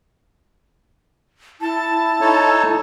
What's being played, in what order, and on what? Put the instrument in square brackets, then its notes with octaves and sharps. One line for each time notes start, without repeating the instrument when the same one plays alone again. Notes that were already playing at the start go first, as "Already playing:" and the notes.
[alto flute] E4 [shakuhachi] A5
[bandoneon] D#4 A4 C#5